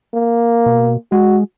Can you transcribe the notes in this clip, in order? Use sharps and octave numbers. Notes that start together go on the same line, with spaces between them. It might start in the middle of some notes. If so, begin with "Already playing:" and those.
A#3
B2
G#3 F#4